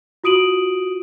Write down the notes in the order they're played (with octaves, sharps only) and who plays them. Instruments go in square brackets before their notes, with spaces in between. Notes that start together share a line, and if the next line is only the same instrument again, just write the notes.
[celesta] F4 F#4 D#6 D7 D#7 F#7